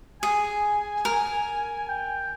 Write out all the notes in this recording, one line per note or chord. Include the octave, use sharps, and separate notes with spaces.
G#4 G#5
A#4
G5